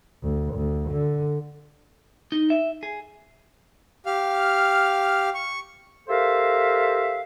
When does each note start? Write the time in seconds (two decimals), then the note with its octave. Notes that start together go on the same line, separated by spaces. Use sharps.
0.23 D2
0.54 D2
0.91 D3
2.32 D#4
2.50 E5
2.83 G#4
4.06 G4 F5 F6
5.35 C#6
6.08 G4 A4 A#4 C5 E5 F5